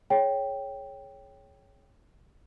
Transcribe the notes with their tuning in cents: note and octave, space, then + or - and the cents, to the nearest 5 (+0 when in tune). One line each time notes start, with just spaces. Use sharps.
G#4 +25 C#5 +0 G5 +0